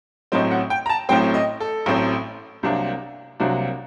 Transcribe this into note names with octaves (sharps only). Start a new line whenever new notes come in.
A1 A2 F#3 C4 D#5
F#5
G5
A#5
A5
A1 A2 F#3 C4 G5
D#5
A4
A1 A2 F#3 C4
C2 C3 F#3 A#3 D4
C2 C3 F#3 A#3 D4 F#4